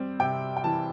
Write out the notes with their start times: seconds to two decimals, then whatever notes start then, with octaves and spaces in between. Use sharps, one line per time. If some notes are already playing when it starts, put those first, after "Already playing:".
Already playing: G3 C4
0.20 C3 G5
0.57 G5
0.64 E3 A5